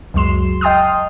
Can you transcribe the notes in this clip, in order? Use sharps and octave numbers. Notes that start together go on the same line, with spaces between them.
C#2 F#2 F#3 G#3 C6 E7
D#5 G5 A5 C6 D#6 F6